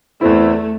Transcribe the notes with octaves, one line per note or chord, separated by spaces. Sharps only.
E2 E3 A3 C4 E4